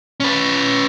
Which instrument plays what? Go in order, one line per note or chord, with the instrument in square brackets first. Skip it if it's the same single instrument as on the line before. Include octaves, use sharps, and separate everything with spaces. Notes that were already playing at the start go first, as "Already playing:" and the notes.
[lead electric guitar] C#4 B4